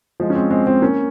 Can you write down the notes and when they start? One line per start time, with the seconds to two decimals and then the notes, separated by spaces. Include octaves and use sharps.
0.20 F3 G#3
0.30 C#4
0.35 G#3 C4
0.51 G#3 C4
0.66 G#3 C4
0.82 A#3 C#4